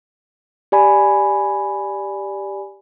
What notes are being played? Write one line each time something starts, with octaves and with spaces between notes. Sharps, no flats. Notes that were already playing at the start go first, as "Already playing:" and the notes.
G4 D5 G#5 B5